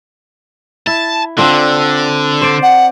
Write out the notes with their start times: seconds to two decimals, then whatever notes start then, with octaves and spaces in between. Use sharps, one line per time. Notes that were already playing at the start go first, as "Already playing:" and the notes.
0.87 E4 A5
1.38 D3 C4 D4 F4
2.42 C5 D5
2.63 F#5